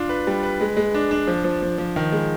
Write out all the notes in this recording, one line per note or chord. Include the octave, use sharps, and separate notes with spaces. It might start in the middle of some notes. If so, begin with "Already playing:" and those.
Already playing: D4 F4
B4
G3
B4
G#3
G#3
D4
D4
F3
F3
F3
F3
D#3
G#3